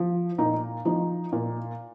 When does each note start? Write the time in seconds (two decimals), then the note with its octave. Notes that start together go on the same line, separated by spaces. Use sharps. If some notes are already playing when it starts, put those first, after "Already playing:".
Already playing: F3
0.38 A#2 D#4
0.85 F3 D#4
1.32 A#2